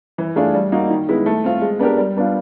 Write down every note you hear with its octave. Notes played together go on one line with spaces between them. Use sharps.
E3
A3 D4 F4 G#4
G3
A#3 D#4 F#4
D#3
G#3 B3 E4
A3
C4 F4
G#3
B3 D4 G4 A#4
G3
B3 D4 F4